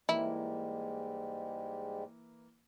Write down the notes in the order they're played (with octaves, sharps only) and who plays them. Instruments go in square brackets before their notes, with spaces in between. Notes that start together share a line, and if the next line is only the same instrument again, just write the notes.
[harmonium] G#2 G3 G#3 [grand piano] E3 A#3 [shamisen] E4